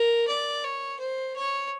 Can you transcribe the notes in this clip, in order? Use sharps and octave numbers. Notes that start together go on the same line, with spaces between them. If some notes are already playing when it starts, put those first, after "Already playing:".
Already playing: A#4
D5
C#5
C5
C#5